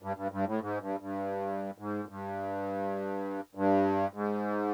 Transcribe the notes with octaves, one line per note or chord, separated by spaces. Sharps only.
G2
G2
G2
A2
G#2
G2
G2
G#2
G2
G2
G#2